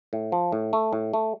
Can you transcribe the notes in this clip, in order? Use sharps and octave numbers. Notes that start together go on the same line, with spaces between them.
A2
F3
A2
A3
A2
A3